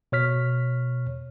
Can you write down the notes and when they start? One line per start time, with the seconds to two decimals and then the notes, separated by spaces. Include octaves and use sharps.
0.12 B2 C#5 F6 B6